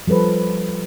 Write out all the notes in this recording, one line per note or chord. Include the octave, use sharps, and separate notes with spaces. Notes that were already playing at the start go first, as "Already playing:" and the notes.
F3 G3 A4 B4 C5